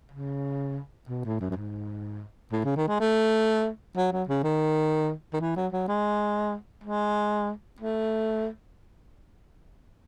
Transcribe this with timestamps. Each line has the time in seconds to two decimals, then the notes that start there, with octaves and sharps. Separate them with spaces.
0.12 C#3
1.09 B2
1.25 A2
1.40 F#2
1.50 F#2
1.56 G#2
2.52 A2
2.65 C#3
2.76 D#3
2.88 G#3
3.00 A3
3.97 F#3
4.12 F#3
4.29 C#3
4.44 D#3
5.33 D#3
5.41 E3
5.56 F#3
5.73 F#3
5.88 G#3
6.84 G#3
7.80 A3